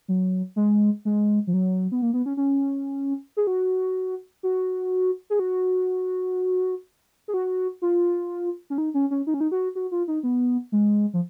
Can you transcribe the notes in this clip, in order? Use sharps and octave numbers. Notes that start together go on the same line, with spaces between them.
F#3
G#3
G#3
F3
F#3
B3
A#3
B3
C#4
C#4
G#4
F#4
F#4
G#4
F#4
G#4
F#4
F4
C#4
D#4
C#4
C#4
D#4
C#4
D#4
F#4
F#4
F4
D#4
B3
G#3
F3